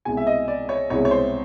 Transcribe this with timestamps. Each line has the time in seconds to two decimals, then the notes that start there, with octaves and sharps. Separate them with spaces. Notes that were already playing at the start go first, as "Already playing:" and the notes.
0.05 C2 B2 G#3 G#5
0.17 E5
0.27 D#5
0.48 D5
0.69 C#5
0.90 C2 B2 G#3 C#5
1.05 C#5
1.11 C5